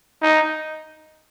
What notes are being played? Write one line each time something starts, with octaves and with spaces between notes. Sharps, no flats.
D#4